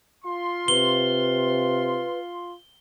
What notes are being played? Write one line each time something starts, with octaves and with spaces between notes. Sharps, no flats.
F4 C6
C3 B4 G7